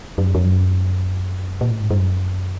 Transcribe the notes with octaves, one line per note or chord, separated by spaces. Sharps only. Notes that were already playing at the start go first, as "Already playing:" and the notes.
F#2
F2
F#2
A#2
A2
G#2
G2
F#2